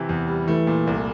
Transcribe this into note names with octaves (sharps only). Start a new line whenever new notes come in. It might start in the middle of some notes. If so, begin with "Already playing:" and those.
Already playing: C3 E3
E2
G3
E3 A3
A#2
C2